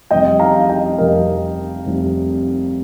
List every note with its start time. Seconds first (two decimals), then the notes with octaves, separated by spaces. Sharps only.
0.11 F1 F2 C3 G3 D#5 G5
0.39 F5 A#5
0.60 F5
0.69 D#5 G5
0.98 F1 F2 C3 G3 A#4 D#5
1.86 F1 F2 C3 G3